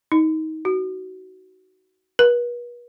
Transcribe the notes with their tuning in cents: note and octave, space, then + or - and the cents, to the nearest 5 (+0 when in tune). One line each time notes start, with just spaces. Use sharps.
D#4 +25
F#4 +15
B4 -40